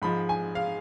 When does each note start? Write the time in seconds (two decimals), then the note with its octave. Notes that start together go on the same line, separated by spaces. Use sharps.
0.02 G#2 F3 G#3 B5
0.29 G#5
0.55 F5